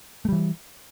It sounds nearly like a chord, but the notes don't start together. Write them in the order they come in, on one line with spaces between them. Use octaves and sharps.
A3 G3 E3